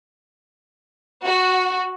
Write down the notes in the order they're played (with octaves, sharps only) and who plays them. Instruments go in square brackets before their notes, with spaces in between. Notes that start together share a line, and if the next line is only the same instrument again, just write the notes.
[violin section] F#4